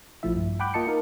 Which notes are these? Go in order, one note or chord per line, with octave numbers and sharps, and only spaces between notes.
A#1 F3 A3 E4 E5
G2
F#5 G5 B5 D6 F#6 G6
A#3 F4 D#5 A5 C#7
D#4 F4 A#4